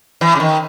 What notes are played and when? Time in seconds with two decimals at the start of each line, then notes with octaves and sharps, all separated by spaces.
0.21 E3
0.35 C#3
0.40 D#3